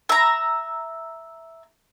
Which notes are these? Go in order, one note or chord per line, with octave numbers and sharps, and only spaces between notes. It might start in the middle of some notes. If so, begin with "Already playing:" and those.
E5 A#5